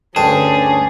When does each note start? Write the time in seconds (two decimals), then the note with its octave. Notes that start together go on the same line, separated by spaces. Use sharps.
0.16 D2 G2 C#4 D4 G#4 G5 A5